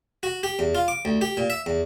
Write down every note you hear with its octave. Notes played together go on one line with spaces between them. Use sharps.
F#4
G4
E2
F4
D6
D2
G4
A#2
E5
E2